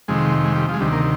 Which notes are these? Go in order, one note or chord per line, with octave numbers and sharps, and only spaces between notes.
F2 C3 D#3 G#3
G#3
G3
F3
G#3
D2 C3 D#3 G3
A#3